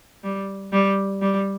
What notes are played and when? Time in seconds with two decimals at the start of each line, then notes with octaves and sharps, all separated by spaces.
0.24 G3
0.73 G3
1.21 G3